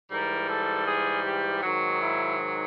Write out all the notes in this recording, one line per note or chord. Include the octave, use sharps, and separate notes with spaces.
G#2 E3 G3 A#4
A4
G#4
G4
G#2 D#3 F#3 F#4
E4